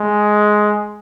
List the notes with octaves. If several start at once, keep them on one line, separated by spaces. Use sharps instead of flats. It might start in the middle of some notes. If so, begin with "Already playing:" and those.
Already playing: G#3